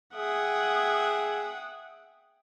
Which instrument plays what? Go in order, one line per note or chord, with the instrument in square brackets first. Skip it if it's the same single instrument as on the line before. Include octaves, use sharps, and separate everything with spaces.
[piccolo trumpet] G#4 [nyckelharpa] E5 G5 [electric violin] F#5 D#6